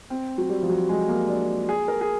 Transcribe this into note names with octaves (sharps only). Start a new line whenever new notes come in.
C4
F#3
G3
F3
F#3
G#3
A#3
D4
G#4
A#4
G#4